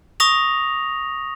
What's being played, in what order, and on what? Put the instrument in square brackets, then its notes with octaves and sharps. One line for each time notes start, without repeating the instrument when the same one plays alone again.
[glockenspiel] C#6 D#6 A#6 F7